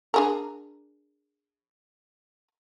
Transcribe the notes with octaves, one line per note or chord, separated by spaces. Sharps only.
D4 G#4 A#4